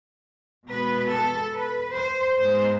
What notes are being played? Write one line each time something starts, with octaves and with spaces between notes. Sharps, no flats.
B2 G#3 B3 B4
A4
B4
C5
G#2 G#3 B3 C5